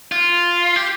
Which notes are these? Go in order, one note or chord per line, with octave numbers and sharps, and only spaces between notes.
F4
G4